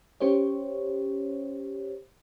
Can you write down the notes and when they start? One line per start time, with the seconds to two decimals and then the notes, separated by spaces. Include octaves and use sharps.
0.20 C#4 G4 C5 C#5